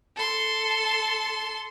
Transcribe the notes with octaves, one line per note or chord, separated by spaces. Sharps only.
A4 C6